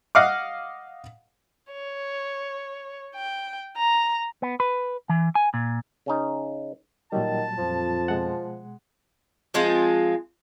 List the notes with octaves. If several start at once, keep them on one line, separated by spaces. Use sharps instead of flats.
D#5 F5 F#5 D6
C#5
G5
A#5
B3
B4
E3
G#5
A#2
C#3 C#4 D#4
A#2 D#3 F#3 G3 A5
F2 F3
B2 G#3 F#5
F3 G#3 C4 F4